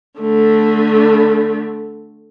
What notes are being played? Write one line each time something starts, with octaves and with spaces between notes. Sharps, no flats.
D3 A3